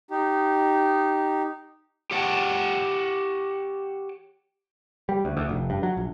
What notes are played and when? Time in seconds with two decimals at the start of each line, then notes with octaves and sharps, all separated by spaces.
0.10 D#4 G4
2.11 G4 C#5 F#5 G5 A5
5.09 G3
5.25 D2
5.37 D2
5.49 F1
5.70 G2
5.83 F#3
5.97 A#1